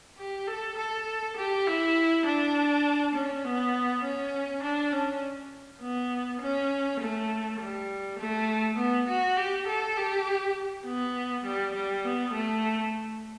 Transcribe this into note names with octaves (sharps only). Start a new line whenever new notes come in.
G4
A4
A4
G4
E4
D4
C#4
B3
C#4
D4
C#4
B3
C#4
A3
G3
A3
B3
F#4
G4
A4
G4
B3
G3
G3
B3
A3